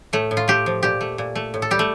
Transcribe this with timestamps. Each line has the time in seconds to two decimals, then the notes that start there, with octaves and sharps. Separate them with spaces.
0.13 A2 A3
0.31 A2
0.37 F4
0.48 A3 G4
0.66 F3
0.83 A#2 G4
1.01 A3
1.18 A#2
1.36 A3
1.54 A2
1.62 A4
1.71 G3 G4
1.79 A3